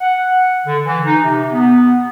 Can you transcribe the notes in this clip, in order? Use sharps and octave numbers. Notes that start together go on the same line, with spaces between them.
F#5
D3
E3
D#4
C3
B3